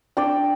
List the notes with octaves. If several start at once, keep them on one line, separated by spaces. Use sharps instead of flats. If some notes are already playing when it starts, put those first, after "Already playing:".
D4 D5 G5